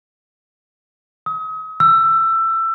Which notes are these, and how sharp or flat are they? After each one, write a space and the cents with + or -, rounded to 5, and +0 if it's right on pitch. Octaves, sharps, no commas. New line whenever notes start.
D#6 +40
E6 +20